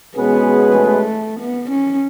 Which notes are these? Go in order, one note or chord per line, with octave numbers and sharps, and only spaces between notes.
B2 G#3 B3 C#4 G#4 B4
A3
B3
C#4